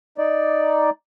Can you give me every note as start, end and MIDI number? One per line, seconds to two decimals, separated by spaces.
0.18 0.90 63
0.18 0.90 74